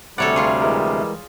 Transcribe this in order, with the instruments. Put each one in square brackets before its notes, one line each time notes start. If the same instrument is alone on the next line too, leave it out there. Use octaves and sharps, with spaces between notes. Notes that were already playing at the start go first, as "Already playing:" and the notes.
[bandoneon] D2 C3 [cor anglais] G3 [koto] A4 C#5 D5 [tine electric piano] F#5
[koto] F4 G#4 [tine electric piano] C#6
[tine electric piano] E3 G#3 A#4